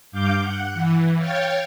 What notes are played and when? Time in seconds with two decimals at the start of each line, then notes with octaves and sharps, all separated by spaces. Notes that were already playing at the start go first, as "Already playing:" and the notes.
0.12 G2 F5 D6 G6
0.41 F#5
0.74 E3
1.18 C#5 F5 G5 A6